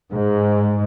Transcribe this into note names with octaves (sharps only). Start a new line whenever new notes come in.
G#2